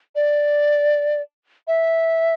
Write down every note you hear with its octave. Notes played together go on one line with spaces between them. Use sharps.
D5
E5